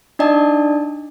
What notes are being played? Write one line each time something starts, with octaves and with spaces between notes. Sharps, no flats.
D4 D#4 D5 D#5 A5